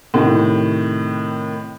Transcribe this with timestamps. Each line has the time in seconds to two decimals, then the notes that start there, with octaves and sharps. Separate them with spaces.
0.14 A2 C3 D#3